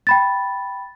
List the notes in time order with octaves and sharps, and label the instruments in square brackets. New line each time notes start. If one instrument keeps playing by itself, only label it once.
[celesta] G5 B5 A6